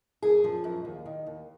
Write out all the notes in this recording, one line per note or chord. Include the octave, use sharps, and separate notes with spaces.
F#2 G#4
F3
F#2
D#2
D#3
D#2